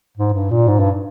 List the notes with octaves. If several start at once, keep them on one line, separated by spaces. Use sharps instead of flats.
G#2
G2
A#2
G#2
G2